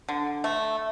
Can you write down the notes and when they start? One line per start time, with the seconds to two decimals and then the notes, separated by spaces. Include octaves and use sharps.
0.08 D3
0.44 A3